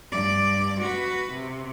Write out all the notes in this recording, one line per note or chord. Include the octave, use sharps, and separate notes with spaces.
G2 D5
F#4 B4
C3